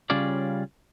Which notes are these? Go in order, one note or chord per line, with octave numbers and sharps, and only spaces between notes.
C#3 G3 C#4 F4 G#4 D5